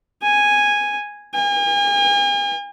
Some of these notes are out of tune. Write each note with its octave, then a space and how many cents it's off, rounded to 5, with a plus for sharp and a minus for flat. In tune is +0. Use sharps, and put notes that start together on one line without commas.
G#5 -5
G#5 -45